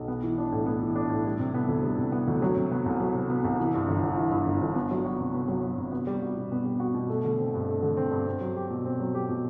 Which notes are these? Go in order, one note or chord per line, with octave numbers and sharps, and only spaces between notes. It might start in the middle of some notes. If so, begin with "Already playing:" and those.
Already playing: B1
B3
E3
D4
A2
B3
E3
D4
A2
G3
C3
B3
D2
G3
C3
B3
D2
F#3
C3
B3
C2
F#3
C3
B3
C2
E3
G2
G1
G1
E3
G2
G1
G1
B3
F#3
F#4
C3
B3
F#3
F#4
C3
B3
G3
F#4
B2
B3
G3
F#4
B2
A3
D3
C4
G2
A3
D3
C4
G2
C4
F#3
G4
B2
C4
F#3
G4
B2